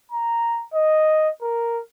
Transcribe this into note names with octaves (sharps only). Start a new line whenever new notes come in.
A#5
D#5
A#4